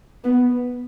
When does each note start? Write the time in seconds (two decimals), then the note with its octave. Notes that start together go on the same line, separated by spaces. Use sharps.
0.24 B3